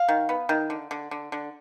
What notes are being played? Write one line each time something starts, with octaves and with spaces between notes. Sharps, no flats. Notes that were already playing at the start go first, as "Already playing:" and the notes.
Already playing: F5
D#3
B3
D#3
D3
D3
D3
D3